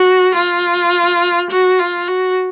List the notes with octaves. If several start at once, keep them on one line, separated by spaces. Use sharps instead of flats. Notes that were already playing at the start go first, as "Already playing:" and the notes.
Already playing: F#4
F4
F#4
F4
F#4